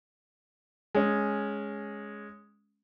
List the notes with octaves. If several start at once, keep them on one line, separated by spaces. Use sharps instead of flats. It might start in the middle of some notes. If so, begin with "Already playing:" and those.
G#3 C#4